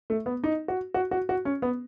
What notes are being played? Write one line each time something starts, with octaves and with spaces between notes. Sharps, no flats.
A3
B3
D#4
F#4
F#4
F#4
F#4
C#4
B3